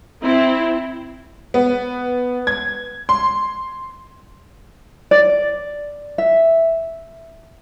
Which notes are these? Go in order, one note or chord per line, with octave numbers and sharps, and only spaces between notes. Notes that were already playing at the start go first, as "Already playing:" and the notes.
C4 E4
B3
G#6
C6
D5
E5